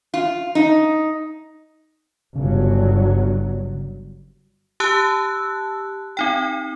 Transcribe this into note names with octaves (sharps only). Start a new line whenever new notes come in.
F4
D#4
G1 C#3 F#3
G4 A5 E6 F#6
C4 D#4 G5